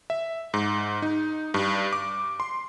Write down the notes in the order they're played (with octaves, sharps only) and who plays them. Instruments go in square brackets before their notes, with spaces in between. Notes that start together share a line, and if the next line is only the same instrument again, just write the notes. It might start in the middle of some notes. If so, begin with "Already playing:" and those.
[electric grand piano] E5
G#2
D#4
G2
D6
C6